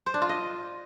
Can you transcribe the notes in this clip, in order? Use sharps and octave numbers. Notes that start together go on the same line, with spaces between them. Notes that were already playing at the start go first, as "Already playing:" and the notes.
C5
D4
F4
D#5